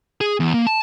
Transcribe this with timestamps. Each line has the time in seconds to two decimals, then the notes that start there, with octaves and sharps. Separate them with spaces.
0.21 G#4
0.40 E2
0.54 A#3
0.67 A5